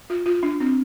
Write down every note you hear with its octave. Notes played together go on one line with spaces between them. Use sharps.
F4
F4
D4
C4